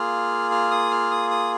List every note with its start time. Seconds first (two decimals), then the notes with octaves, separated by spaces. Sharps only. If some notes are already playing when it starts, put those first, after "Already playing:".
Already playing: A#3 F4 G#4 F6
0.51 F6
0.71 D#6
0.91 F6
1.11 D#6
1.31 D#6